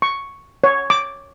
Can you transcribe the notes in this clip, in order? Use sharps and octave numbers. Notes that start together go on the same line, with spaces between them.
C#6
C#5
D6